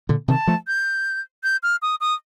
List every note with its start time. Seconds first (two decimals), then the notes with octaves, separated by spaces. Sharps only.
0.09 A#2 D3
0.28 C3 D#3 A5
0.47 F3 A3
0.67 G6
1.43 G6
1.63 F6
1.82 D#6
2.01 D#6